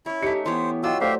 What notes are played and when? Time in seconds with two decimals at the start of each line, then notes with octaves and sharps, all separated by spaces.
0.06 C#4 E4 C#5
0.23 A3 D#4 G4 B6 C#7
0.46 E3 B3 G4 C5 C#5
0.83 F#3 F4 F#4 D#5 G5 D6 E6
1.01 A3 G4 C5 D5 E5 F5